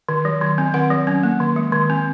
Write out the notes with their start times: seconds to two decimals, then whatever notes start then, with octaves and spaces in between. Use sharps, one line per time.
0.09 D#3
0.25 F#3
0.41 D#3
0.58 C4
0.74 D#3 F#5
0.90 F#3
1.07 C#4
1.23 A#3
1.40 D#3
1.56 G#3
1.72 D#3
1.90 C4